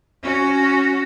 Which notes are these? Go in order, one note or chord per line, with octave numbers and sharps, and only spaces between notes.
C#4 F#4